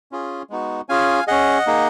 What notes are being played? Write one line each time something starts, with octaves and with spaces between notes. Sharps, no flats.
C#4 F4 G#4
G#3 B3 D#4 F#4
C#4 F4 G#4 F5 G#5
C#4 G#4 D#5 F#5
A#3 D#4 G#4